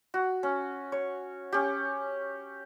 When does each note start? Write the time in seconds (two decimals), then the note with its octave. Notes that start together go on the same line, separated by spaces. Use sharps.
0.14 F#4
0.43 C#4
0.92 C#5
1.53 C#4 G4